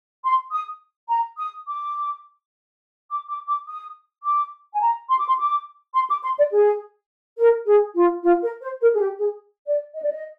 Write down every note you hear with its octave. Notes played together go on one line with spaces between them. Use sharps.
C6
D#6
A#5
D#6
D6
D6
D6
D6
D#6
D6
G#5
A#5
C6
D6
C6
D6
C6
D6
C6
D5
G#4
A#4
G#4
F4
F4
A#4
C5
A#4
G#4
G4
G#4
D5
D#5
D5
D#5